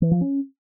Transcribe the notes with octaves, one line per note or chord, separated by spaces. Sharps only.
E3
F3
C#4